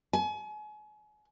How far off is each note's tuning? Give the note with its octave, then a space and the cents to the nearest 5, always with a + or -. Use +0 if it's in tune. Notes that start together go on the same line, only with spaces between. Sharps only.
G#5 +35